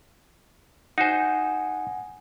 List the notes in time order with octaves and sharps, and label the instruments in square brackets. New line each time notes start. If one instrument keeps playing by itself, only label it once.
[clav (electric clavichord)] D#4 F#4 C5 [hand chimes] F#5 G#5